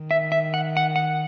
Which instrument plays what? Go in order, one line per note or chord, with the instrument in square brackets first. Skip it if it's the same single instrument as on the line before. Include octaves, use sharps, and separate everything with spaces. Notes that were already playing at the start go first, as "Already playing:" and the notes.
Already playing: [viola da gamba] D#3
[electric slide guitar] E5
E5
F#5
F#5
F#5